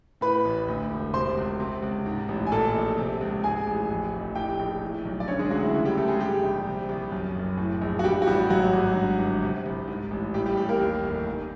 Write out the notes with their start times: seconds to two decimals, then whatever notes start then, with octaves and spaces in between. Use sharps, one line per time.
0.21 A2 B4 B5
0.45 A1
0.68 D2
0.90 E1
1.13 C3 C5 C6
1.37 C#2
1.60 C3
1.82 C#2
2.06 G#2
2.28 A1
2.47 G#5
2.52 A#2 A4 A5
2.75 A#1
2.98 C3
3.21 C#2
3.44 G#2 G#4 G#5
3.67 A1
3.90 F2
4.13 F1
4.35 A2 G4 G5
4.59 A#1
4.82 A2
5.05 B1
5.20 D5
5.28 D3 C#4 C#5
5.39 G#3 G#4
5.50 D2 F#3 F#4
5.63 E4
5.74 C#3 E4
5.85 G3 G4
5.97 D2 A3 A4
6.08 G#3 G#4
6.20 G#2 G3 G4
6.43 A#1
6.66 C3
6.89 C2
7.12 F#2
7.35 F#1
7.57 A2
7.81 A#1
7.99 F#4
8.04 G2 G3 G4
8.22 F#4
8.27 A1 G3 G4
8.50 G#2 F#3 F#4
8.73 G#1
8.96 G2
9.19 G1
9.43 C3
9.65 C2
9.88 G#2
10.11 A1
10.34 A2 G3 G4
10.46 G3 G4
10.57 A1 G3 G4
10.69 A#3 A#4
10.80 D#2
11.04 F1
11.26 D#3